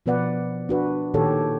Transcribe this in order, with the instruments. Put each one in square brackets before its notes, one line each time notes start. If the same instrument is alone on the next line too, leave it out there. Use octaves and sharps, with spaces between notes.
[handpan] B2 F3 B3 B4 D5 F#5
D4 F#4 B4
A#2 D#3 G4 A4 C#5